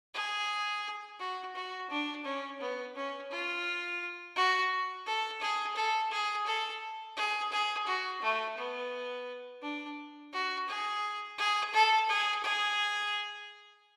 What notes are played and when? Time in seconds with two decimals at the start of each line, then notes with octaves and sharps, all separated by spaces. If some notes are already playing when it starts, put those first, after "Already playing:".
0.14 G#4
1.19 F#4
1.55 F#4
1.89 D4
2.24 C#4
2.60 B3
2.95 C#4
3.30 F4
4.36 F#4
5.06 A4
5.41 G#4
5.76 A4
6.11 G#4
6.46 A4
7.17 G#4
7.52 G#4
7.86 F#4
8.22 A3
8.57 B3
9.62 D4
10.33 F#4
10.68 G#4
11.38 G#4
11.73 A4
12.09 G#4
12.43 G#4